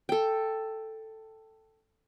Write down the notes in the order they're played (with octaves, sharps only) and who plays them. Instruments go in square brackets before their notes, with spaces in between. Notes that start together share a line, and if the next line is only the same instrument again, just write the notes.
[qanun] A4 G5